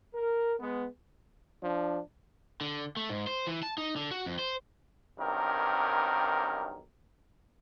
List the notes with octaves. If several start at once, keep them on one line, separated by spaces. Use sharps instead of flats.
A#4
G#3 B3
F3 D4
D3
A3
G#2
C5
E3
A5
D#4
D3
F#4
F2
C5
B1 G2 D#3 C4 A#4